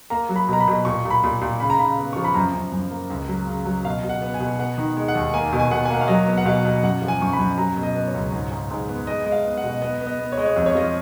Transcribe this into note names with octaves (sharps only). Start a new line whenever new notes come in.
A#3 A#5
F#3
B5
B2 A#5
B5
B2
A#2 C#6
A#2
B5
A#2
A#2
C#3 B5
A#5
C#3 B5
B3
F3 C#6
B5
F#2 A#5
F#2
F#2
A#3
C#2
F#3
C#3
F#3
B2 F5
B2
F#5
B3
G#5
B2
B3 F#5
D#3
G#3
F#5
D#2
A#3 G#5
B2
G#5
B2 F#5
G#5
A#3 F#5
F5
F#3 D#5
B3
F#5
B2 F5
B2
F#2 F#5
F3
G#5
F#2 C#6
B5
F#2
F#3 A#5
B2
D#5
B3
C#5
C#2
G#2
G#2
G#2
B3
G#3 D#5
G#3
F5
B3
F#5
B2
B3 D#5
B3
D#5
B3
C#5
G#3 D#5
C#5
F2 D#5
C#5
F3 D#5